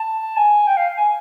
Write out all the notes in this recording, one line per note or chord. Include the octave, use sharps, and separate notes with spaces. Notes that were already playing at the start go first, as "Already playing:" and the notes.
Already playing: A5
G#5
G5
F5
G#5